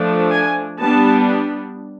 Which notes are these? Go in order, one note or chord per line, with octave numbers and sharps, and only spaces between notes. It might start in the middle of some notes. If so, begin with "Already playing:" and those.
Already playing: F3 A3 D4
G#5
G3 B3 D4 A5